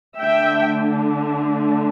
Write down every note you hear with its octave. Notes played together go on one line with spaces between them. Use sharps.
D3 A3 D4 E5 G5